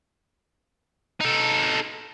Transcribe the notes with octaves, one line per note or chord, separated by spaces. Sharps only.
D#4 A4